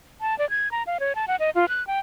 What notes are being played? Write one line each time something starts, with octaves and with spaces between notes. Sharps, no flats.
A5
D5
G#6
A#5
F5
C#5
A5
F#5
D#5
F4
F#6
G5